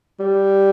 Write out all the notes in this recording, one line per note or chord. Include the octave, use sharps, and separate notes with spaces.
G3